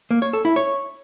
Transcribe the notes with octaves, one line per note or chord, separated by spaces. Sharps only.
A#3
C#5
A4
E4
C#5